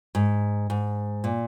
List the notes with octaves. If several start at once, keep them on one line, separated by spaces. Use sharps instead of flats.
G#2
G#2
A#2